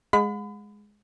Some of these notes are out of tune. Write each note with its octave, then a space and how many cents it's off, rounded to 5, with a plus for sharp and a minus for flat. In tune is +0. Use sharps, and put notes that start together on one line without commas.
G#3 +0 F#5 -40 B5 +35